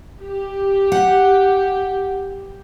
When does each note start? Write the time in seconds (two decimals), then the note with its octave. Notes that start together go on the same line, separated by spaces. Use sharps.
0.23 G4
0.92 F#5